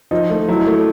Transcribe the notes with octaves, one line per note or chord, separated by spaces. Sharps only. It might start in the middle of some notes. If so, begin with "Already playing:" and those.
F3 D#4
A3
F#3 E4
E4
A3